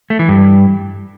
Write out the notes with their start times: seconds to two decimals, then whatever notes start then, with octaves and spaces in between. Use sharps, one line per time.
0.10 A3
0.19 E3
0.28 G2